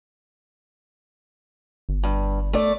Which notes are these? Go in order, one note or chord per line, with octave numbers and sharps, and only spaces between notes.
G1
G2
A3 D5